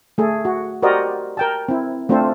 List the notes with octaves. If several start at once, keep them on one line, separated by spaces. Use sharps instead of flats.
A3 G#4 A4
F#4
F#4 G4 A#4 C5 D5 D#5
A#4 G5 A5
C4 E4
A3 C4 D4 F4 A4 C5